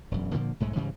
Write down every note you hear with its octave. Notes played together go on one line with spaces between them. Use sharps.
E1 F#2
A#2 D3 F3 A#3
B1 G#2 G#3 A3
G#2 C#3 E3 G3